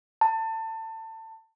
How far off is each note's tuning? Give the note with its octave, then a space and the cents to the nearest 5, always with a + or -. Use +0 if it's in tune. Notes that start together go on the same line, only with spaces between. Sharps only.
A5 +25